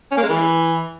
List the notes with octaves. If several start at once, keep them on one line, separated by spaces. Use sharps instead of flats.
C#4
A#3
G#3
E3